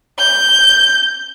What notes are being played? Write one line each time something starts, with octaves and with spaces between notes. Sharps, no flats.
G6